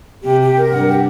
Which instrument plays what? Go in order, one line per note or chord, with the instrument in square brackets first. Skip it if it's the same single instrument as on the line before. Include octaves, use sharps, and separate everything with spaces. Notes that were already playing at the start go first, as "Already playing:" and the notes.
[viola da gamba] C3 [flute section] G4
[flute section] G4
A#4
[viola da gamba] G2 [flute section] F#5
[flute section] G4